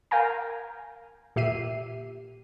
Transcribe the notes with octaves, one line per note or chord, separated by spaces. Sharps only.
A#4 F5 G5 G#5 A#5
A#2 G4 E5 C7 D#7